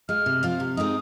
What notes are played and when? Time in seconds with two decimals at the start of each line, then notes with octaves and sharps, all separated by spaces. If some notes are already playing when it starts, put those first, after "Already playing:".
0.09 G#3 F4 F6
0.26 C3
0.43 F3 C4 F4
0.60 C3
0.77 G#3 C4 D#4 D#6